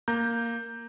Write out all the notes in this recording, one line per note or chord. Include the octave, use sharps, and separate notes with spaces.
A#3 A#5 G6